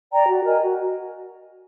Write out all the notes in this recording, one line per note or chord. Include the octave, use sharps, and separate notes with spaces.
D5 G5 A#5
F#4
A#4 D#5 G#5
F#4